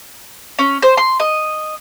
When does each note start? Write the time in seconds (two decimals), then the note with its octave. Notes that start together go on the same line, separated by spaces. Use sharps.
0.59 C#4
0.82 C5
0.97 C6
1.20 D#5